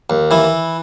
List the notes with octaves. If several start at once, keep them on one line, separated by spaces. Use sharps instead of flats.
D#2
E3 E4